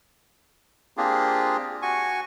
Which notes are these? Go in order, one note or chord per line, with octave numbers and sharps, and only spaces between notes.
A#3 C4 D4 F4 G4 G#4
F#4 G#5 C#6